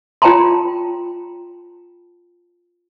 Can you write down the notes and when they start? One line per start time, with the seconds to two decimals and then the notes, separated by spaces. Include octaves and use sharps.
0.22 F4 C#5 G5 A5 A#5 C6